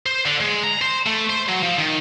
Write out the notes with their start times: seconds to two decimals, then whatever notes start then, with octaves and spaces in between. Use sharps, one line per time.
0.06 C5
0.26 D3
0.41 G#3
0.64 A#5
0.82 C5
1.06 A3
1.29 C5
1.48 F#3
1.63 F3
1.78 D#3